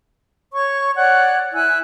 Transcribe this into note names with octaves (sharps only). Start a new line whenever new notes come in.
C#5 C#6
C#5 D5 F#5
E4 G#5 E6 F#6